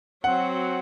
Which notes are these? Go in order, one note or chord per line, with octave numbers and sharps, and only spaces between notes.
F#3 C4 F#4 F#5